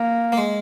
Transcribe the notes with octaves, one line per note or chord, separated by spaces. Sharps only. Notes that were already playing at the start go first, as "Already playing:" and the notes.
Already playing: A#3
A#3
G#3